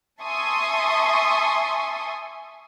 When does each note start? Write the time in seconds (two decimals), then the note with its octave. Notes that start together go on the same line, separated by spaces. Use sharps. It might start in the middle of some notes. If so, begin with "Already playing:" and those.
0.23 E5 G#5 A5 C6 C#6 D#6